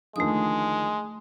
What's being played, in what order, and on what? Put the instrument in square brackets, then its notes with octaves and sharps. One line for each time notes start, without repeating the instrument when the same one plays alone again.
[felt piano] D#2 D3 F3 [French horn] G#3 [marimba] A3 D#6